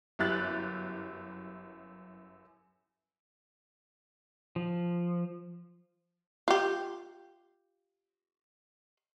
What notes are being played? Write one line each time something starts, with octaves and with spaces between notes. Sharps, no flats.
G1 F#2 E4 G4 F#6 A6
F3
F4 G4